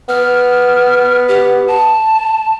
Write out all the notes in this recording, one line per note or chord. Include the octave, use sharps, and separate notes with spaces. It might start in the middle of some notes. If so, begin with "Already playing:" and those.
B3 F6
G4
A5